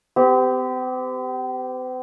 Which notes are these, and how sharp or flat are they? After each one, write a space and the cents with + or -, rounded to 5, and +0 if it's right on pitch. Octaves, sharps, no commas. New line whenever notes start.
C4 -45 G4 +0